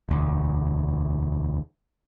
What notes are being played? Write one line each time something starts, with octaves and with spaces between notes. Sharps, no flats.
E1 D2